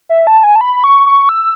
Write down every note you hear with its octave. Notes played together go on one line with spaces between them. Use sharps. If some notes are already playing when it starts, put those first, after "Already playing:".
E5
A5
G#5
A5
B5
C#6
C#6
E6